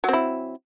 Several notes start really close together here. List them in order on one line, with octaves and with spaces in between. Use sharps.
F#3 C4 E4